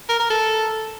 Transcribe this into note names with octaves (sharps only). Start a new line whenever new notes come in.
A#4
A#4
A4